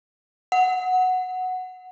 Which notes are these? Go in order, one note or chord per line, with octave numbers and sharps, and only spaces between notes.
F#5